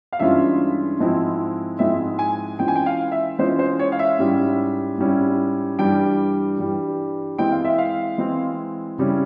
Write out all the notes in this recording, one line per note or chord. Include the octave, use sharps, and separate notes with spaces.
F5
G2 E3 G#3 C#4 F4 E5
G#2 F3 G#3 C4 E4
G#2 F3 G#3 C4 E4 E5
G#5
E3 G#3 C#4 F4 G5
G#5
G5
F5
E5
E3 G#3 C#4 F4 C5
C5
C#5
F5
E5
G#2 G3 C#4 E4
G#2 G3 C#4 E4
G2 E3 G3 G5
G2 E3 G3
E3 G#3 C4 E4 G5
F5
E5
F5
E3 G#3 C4 E4
C#3 G3 C#4 E4